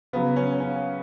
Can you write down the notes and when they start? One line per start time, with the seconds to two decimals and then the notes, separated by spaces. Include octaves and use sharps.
0.13 C#3 F#3 B3
0.36 C#4
0.60 C#4